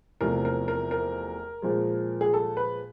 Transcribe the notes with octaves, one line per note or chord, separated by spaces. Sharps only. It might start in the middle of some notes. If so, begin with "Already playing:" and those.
E2 C3 F3 A3 A#4
A#4
A#4
A#4
A#2 F3 G#3
G#4
A4
B4